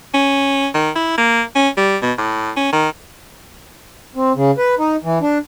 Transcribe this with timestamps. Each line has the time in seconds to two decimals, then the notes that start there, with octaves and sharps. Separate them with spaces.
0.14 C#4
0.75 D#3
0.96 E4
1.18 A#3
1.55 C#4
1.78 G3
2.02 B2
2.18 A2
2.57 C#4
2.73 D#3
4.16 C4
4.36 C#3
4.58 B4
4.79 D#4
5.04 E3
5.22 D4